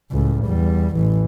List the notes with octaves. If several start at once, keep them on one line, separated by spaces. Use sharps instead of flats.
C#2 A2
E2 G3
A1 E3